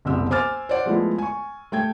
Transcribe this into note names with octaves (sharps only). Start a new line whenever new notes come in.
F#1 C2 B2 G4 E6
C5 G#5 D6 E6 F6 A6
C5 D5 F#5
F3 G#3 A3 B3 E4
G#5 C#6
A3 G5 G#6